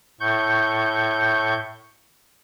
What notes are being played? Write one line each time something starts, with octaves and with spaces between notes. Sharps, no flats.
A2 C#6 G6